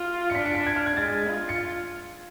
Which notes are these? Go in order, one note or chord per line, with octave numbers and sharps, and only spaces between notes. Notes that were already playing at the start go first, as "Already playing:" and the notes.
Already playing: F4
C#7
D4 B6
C#7
B6
G#6
F6
G#6
G#3 A6
F4
C#7